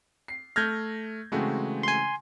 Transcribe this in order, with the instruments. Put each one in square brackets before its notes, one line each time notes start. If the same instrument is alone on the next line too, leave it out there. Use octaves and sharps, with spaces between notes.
[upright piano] C7
[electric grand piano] A3 F6 [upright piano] G6 G#6 A#6
[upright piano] C#3 E3 C4 [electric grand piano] G#3 A3 F#4
[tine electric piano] G#5 C6